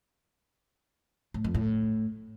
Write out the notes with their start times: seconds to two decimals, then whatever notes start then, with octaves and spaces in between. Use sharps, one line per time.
1.34 A2
1.44 F2
1.55 A2